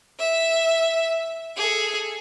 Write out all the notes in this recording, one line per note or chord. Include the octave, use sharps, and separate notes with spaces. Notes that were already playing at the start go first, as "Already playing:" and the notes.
E5
G#4 A4